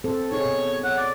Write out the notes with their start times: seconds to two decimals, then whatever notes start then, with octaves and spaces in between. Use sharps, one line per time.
0.04 C4 A4 C5
0.32 D#4 G#4 C#5
0.45 B2
0.84 C#5 F#5
0.98 D5